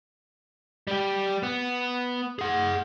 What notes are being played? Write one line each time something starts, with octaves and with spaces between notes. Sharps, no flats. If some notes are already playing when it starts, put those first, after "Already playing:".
G3 G4
B3
G#4 F#5